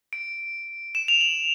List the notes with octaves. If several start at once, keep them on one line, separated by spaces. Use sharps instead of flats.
D7
E7
F7
F#7